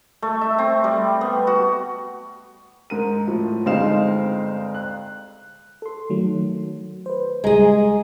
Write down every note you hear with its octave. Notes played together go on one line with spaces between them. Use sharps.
A3
E5
C4
G3
B3
F#4
G#2 A#4 D#7
A2 F3
G1 G#3 C4 D#4 F5 E7
F#6
A4 C6
D#3 F#3 A3
B4 C5
C#2 G3 G#3 G#4 A#5